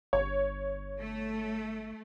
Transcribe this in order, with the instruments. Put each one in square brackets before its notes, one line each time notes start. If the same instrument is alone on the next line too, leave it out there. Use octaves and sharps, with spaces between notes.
[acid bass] G1 [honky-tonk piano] C#5
[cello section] A3